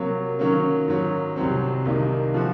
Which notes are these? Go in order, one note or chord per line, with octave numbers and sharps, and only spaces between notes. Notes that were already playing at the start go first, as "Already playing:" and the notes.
Already playing: C3 F#3 A#3
D#3 F#3 A#3 C#4
G#2 D#3 F#3
C2 C3 F#3 C4
C2 C3 D#3 A#3 D#4
F3 C4 F#4